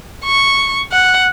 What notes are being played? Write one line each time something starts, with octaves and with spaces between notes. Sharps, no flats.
C#6
F#5